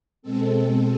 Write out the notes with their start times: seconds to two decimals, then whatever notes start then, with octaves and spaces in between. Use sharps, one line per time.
0.22 B2 G#3 C4 A4
0.51 A4